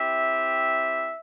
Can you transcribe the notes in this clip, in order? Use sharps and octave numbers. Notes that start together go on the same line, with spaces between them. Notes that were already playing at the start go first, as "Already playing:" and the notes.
Already playing: C4 E4 G4 E5